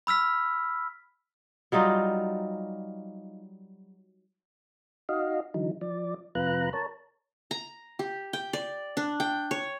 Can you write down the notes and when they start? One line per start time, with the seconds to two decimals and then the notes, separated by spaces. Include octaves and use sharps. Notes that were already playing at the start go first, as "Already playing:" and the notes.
0.07 B5 E6 F6 B6
1.72 F#3 G3 D#4 F4
5.09 D#4 F#4 D#5 F5
5.54 D3 E3 F#3 D#4
5.81 F3 D5
6.35 F2 C3 F4 B4 A#5 F#6
6.73 A#4 C#5 A5
7.51 A#5
7.99 G4
8.33 G5
8.53 D5
8.97 D4
9.20 G5
9.51 C#5